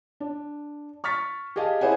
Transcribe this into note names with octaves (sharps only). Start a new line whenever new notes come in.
D4
C#6 F6 A6 B6
G4 G#4 D#5 F5 A5
E4 G#4 C5 F#5 G#5